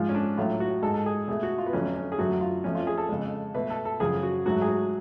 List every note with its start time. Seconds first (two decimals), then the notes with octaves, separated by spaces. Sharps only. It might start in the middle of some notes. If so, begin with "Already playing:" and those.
Already playing: G#2 F3 G#3 F4
0.09 C#4
0.15 D4
0.37 A2 F#3 A3 F4
0.60 F#4
0.82 G#2 G#3 A4
0.94 A4
1.06 G#4
1.28 B2 A3 G#4
1.43 F#4
1.58 F4
1.66 B3
1.73 F2 D3 F#3 A3 C#4
1.96 C#4
2.12 G#4
2.19 F#2 D3 F#3 A3 F#4
2.41 F4
2.64 F2 F3 A3 C#4
2.75 F4
2.87 G#4
2.98 A4
3.09 F2 C#3 G#3
3.54 B2 A3 B4
3.70 A4
3.85 A4
4.00 F#2 C#3 F3 G#4
4.23 F#4
4.46 G#2 F#3 A3 F#4
4.62 G#4
4.68 F#4